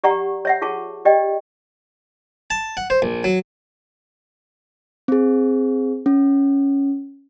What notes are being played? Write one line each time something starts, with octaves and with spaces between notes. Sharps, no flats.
G4 D5 F#5 A#5 C#6
C#5 E5 F#5
F4 G#4 A5 C#6
G4 D5 D#5 G5
A5
F#5
C5
A#1
F#3
C4 G#4
C#4